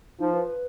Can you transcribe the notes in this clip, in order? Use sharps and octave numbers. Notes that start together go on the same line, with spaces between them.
F3 D#4
B4
B4